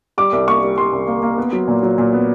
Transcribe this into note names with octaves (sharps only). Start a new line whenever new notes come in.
G3 D6
C2
A#3 C#6
G3
G3 C6
C2
A#3
A#3
B3
F#3
A#2
F#3
A#2
B3